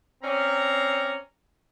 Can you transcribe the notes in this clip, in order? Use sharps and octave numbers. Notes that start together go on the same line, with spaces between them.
C4 C#4 D5 A#5